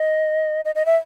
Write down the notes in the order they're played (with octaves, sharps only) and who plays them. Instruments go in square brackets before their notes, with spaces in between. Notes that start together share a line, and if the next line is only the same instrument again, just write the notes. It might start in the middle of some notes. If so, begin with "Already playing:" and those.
Already playing: [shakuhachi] D#5
D#5
D#5
E5